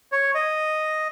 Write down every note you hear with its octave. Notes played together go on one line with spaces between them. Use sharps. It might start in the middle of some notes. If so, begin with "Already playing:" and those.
C#5
D#5